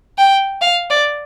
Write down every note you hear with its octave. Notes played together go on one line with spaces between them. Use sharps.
G5
F5
D5